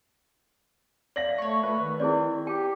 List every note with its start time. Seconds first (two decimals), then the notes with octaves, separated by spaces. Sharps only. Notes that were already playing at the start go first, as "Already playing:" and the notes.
1.16 D5 E5 F5 A#6 F#7
1.38 A3 C#5 C#6
1.63 A3 B4
1.78 D#3
2.00 C4 E4 G#4 D5
2.47 G4 G5